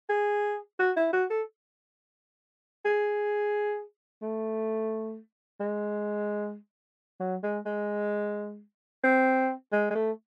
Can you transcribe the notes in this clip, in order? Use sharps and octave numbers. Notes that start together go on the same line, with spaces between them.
G#4
F#4
E4
F#4
A4
G#4
A3
G#3
F#3
G#3
G#3
C4
G#3
G#3
A3